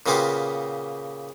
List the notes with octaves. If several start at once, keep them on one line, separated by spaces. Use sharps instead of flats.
A#2 C#3 A#3 B3 F4 G4